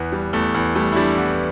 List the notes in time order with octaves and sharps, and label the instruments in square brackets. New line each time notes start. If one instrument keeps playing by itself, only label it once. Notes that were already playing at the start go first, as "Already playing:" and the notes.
Already playing: [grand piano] E2 B3
G3
E2 A3
E2
G3 A3
E4
G3 D4
E3 B3